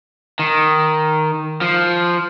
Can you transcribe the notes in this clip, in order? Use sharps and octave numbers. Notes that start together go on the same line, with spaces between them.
D#3
F3